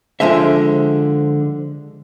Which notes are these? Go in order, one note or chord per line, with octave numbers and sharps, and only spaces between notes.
D3 F3 G#3 C5 E5